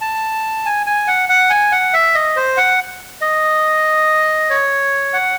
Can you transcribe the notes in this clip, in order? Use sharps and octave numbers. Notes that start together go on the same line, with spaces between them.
A5
G#5
G#5
F#5
F#5
G#5
F#5
E5
D#5
C5
F#5
D#5
C#5
F#5